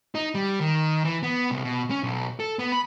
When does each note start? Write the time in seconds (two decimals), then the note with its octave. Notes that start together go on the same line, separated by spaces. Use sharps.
0.15 D#4
0.35 G3
0.61 D#3
1.05 E3
1.23 B3
1.51 C2
1.64 B2
1.90 C#4
2.03 B1
2.40 A4
2.59 B3
2.72 B5